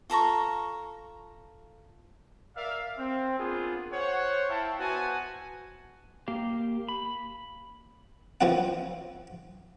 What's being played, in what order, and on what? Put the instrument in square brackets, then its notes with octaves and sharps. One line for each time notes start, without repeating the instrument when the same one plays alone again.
[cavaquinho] F4 A4 A#5 C#6
[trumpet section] A#4 D5 E5 F5
C4
A#3 B3 D4 F4 G#4
C5 C#5 F#5
E4 E5 F5 G5 A5
B3 F#4 C5 F#5 G#5 A5
[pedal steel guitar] A#3 G4 F5
B5
[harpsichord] E3 F3 C4 F#5